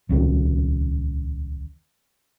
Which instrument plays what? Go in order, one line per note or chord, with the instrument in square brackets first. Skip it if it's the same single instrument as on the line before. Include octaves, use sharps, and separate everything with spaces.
[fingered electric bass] D#1 C#2 D#3